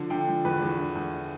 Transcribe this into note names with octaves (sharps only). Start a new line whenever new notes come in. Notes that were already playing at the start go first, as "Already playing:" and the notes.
Already playing: D3 F3
D3 G5
F3
E2 B4
E2
D3
E2